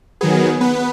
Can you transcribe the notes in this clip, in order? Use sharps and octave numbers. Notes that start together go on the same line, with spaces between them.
D#3 F#3 B3 G#4
B3 B4